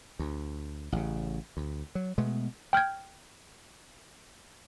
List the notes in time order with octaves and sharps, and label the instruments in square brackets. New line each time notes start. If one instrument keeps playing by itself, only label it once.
[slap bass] D2
A1 C#3
D2
F#3
B2 G#3 A3 B3
[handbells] G5 F6 G6 G#6